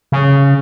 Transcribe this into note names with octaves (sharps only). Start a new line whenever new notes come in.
C#3